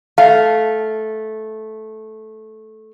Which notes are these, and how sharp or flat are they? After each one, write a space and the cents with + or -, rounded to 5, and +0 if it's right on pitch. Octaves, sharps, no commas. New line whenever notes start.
A3 -10 F5 +0